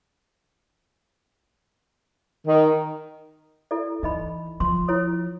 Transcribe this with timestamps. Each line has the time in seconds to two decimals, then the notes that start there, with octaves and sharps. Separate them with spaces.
2.47 D#3
3.71 E4 A4 D5
4.03 E3 D#4 D#5 B5
4.60 F3 C6
4.88 E4 C#5 D#6